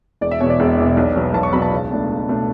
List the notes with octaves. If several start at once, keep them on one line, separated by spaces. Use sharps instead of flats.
E1 D5
E5
E2 B2 C#5
D5
E1
E2 B2
B1
B2 F#3 B3
B1 A5
C#6
B2 F#3 B3 B5
A5
C#2
B2 A3 D4
C#2
B2 A3 D4